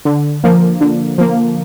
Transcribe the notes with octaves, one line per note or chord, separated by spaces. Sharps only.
D3
F3 A#3
D3
F3 A#3